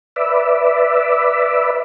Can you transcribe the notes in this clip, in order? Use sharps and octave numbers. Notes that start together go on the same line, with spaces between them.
B4 D5 E5